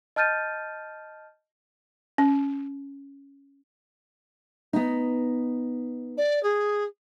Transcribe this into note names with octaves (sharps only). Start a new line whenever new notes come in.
D#5 A5 F6 G6 A6 D#7
C#4
B3 D#4
D5
G#4